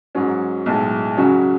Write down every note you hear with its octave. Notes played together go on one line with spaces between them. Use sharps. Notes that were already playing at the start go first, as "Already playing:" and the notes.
G#2 F#3 C#4
B1 A2 G#3
C#3 F#3 C#4 F#4